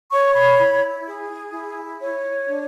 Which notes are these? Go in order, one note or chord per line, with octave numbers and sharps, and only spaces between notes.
C#5 C#6
B5
E4 B5
G#4
E4
C#5
D4